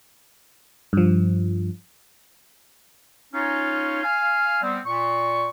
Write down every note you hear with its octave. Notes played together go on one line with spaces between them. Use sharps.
G2 F3
C#4 D#4 F4 C#5
F5 G#5 F6
G3 B3 C4
A#2 C#6